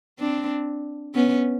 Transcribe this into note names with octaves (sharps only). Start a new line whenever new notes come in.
C4 D4
B3 C#4